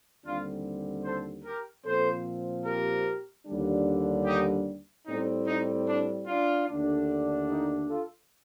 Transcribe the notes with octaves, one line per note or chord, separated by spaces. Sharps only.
D#2 D3 G3 C4 D4 F4
A4 C5
G4 A#4
A#2 F3 C4 A4 C5
G4 A#4
D#2 D3 G3 D4
D#4 G4
A2 G3 C4 D#4
D#4
D4
D4 F4
D#2 D3 A3 D4
D#4 G4
F4 A4